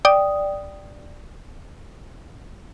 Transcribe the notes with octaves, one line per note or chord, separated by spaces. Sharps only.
D5 G5 D#6